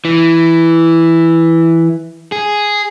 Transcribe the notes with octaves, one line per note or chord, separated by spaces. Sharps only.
E3
G#4